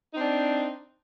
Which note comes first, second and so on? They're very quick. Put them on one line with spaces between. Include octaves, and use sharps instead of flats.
D#4 C4 D4